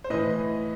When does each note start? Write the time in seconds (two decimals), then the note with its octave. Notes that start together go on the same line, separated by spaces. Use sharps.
0.04 C5
0.10 A2 E3 B4 D#5